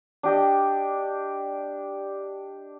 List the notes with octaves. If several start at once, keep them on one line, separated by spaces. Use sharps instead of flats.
D4 G4 D#5